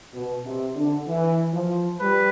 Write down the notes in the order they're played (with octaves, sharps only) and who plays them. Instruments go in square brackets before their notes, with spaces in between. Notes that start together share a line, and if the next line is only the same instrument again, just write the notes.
[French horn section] B2
C3
D3
E3
F3
[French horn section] G3 [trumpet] B4